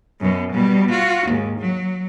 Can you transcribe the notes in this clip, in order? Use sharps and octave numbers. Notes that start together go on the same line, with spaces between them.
F#2 B2
B2 G3
F4 F#4
D#2 G#2
F#3